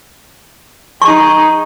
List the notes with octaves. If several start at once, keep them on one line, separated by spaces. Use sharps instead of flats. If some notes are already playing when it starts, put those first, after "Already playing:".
D#4 G#4 C#6